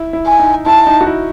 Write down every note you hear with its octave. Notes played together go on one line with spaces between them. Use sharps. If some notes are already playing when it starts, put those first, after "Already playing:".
Already playing: E4
E4
G#5
D#4
E4 A5
D#4
F#4
E4